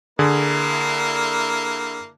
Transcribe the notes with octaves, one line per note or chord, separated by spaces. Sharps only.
D3 A#3 E4 G#4